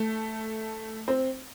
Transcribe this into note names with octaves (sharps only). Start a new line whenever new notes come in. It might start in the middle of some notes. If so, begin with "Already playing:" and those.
Already playing: A3
C4